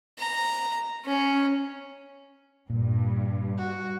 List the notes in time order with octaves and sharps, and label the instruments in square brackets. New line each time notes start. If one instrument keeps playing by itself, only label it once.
[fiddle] A#5
C#4
[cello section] G2 [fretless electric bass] A#2
[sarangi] F#4